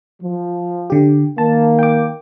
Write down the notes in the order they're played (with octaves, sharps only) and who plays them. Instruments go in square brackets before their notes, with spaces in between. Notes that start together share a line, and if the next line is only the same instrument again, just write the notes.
[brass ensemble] F3
[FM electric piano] D3 G4
[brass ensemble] D#3 A#3 [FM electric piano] A5
[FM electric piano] G5 D6